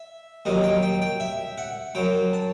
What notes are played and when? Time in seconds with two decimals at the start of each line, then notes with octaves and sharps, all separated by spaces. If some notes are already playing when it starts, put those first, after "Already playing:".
Already playing: E5
0.45 D#2 D#3 F#3 D#5
0.63 G5
0.82 G5
1.02 G5
1.20 E5
1.58 F#5
1.95 F#2 F#3 G5
2.33 A5